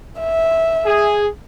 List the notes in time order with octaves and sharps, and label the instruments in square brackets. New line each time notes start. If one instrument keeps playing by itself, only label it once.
[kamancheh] E5
[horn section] G#4